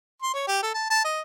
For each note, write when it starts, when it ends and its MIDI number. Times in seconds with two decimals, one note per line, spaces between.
0.22 0.34 84
0.34 0.47 73
0.48 0.60 67
0.63 0.73 69
0.74 0.90 81
0.90 1.01 81
1.05 1.21 75